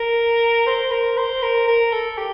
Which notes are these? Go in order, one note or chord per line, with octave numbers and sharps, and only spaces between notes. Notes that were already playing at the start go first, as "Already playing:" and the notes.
Already playing: A#4
C5
A#4
C5
A#4
A#4
A4
G4